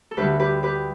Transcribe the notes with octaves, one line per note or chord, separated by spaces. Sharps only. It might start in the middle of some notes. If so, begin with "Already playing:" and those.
A4
D2 D3 G3 G4 B4
G4 B4
G4 B4